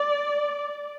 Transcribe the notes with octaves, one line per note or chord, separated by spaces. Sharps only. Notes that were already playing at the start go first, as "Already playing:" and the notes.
Already playing: D5